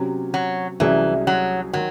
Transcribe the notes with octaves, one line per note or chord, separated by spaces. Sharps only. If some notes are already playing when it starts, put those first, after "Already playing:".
Already playing: C3 F#3 C#4
F#3
C2 C3 E3 F#3 C#4 G#4
F#3
D#3 F#3